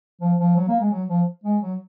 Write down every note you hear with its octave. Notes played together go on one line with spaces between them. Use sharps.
F3
F3
F#3
A#3
G#3
F#3
F3
G#3
F#3